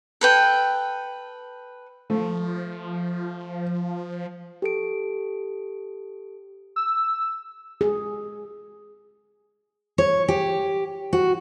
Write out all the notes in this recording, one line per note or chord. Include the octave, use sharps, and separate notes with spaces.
A4 B4 G5
F3 A3
G4 A4 D7
E6
G#4
C#5
G4
F#4